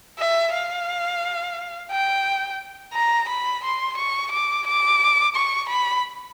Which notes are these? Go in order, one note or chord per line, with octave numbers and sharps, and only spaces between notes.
E5
F5
G5
A#5
B5
C6
C#6
D6
D6
C#6
B5